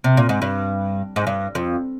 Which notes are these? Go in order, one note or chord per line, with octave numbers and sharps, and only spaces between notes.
C3
A#2
G#2
G2
G#2
G2
F2